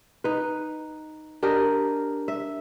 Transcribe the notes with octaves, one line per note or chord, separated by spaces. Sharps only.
D#4 B4
D4 G4 A#4 D#5
E5